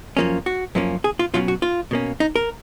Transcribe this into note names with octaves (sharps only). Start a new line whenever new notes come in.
F#2 F3 A#3 C#4
F#4
F#2 F3 A#3 C#4
G#4
F4
B2 F#3 C#4 F4
F#4
F4
B2 A#3 C#4
D#4
A#4